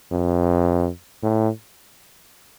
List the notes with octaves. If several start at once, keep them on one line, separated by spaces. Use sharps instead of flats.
F2
A2